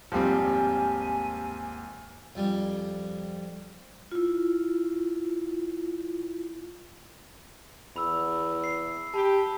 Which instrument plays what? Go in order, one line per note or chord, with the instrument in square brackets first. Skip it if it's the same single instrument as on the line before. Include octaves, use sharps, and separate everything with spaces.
[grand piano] G#1 D#2 [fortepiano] F3 G3 C4 [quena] G#5
[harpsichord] F2 G3
[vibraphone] E4 F4
[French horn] E2 [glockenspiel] B5 E6
[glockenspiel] C7
[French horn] G4 [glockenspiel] A5 B5